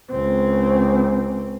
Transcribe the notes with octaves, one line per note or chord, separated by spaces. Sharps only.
C#2 C4